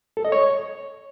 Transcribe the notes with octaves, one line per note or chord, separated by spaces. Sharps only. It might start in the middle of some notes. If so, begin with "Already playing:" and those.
A4
D#5
C#5